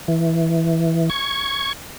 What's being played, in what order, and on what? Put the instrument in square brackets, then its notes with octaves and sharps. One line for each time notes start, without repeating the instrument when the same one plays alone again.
[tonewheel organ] E3
C#6 G#6